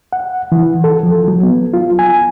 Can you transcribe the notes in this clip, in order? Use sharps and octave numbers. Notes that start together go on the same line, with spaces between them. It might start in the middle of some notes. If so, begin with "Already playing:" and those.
F#5
E3
A4
F3
F#3
B3
F4
G#5